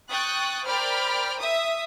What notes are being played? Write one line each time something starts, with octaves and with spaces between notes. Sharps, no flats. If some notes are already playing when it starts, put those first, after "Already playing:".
G5 C#6 D#6 F#6 A6
A#4 C5 D5 G5 B5 F6
E5 D#6